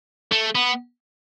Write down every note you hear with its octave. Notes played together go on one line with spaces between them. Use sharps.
A3
B3